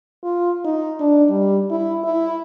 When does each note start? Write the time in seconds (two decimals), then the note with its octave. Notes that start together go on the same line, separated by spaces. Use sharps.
0.23 F4
0.65 D#4
1.00 D4
1.29 G3
1.71 E4
2.04 E4